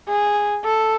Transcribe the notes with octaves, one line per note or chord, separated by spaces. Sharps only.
G#4
A4